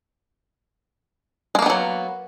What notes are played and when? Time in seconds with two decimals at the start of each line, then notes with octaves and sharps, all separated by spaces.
1.55 G#3
1.59 A#3
1.62 B3
1.66 D#3
1.70 F#3